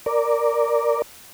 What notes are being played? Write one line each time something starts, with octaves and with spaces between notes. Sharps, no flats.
A#4 D5